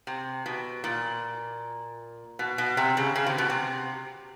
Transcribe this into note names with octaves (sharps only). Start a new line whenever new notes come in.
C3
B2
A#2
B2
B2
C3
C#3
C#3
C3
B2
C3